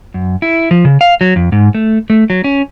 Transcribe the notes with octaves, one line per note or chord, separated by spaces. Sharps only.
F#2
E4
F3
C#3
F5
F#3
F2
G#2
A3
A3
F#3
C#4